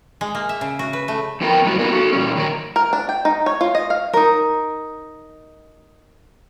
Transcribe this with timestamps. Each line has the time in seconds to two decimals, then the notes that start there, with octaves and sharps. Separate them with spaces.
0.21 G#3
0.35 A#3
0.49 E5
0.61 C#3
0.79 F#4
0.93 B4
1.08 A3
1.41 F2 F3 B3 F4 A#4 G5
1.64 F#2 A2 G3 F#4
1.79 B3 D#4 F4 A#4 B4
1.92 F#4 A4
2.13 A#2 E3 G3 C#4
2.36 A2 D#3 F#3 A#4 A#5
2.76 A#4
2.93 D4
3.09 G5
3.25 D#4
3.46 C#5
3.61 F4
3.75 D#5
3.90 F5
4.13 D#4 A#4